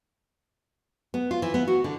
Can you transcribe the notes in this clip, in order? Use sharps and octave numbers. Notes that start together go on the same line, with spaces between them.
B3
F4
E3
B3
F#4
D3